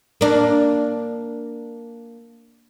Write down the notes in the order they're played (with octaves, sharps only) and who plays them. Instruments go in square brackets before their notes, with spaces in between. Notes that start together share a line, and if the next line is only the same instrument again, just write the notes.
[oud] A#3 D4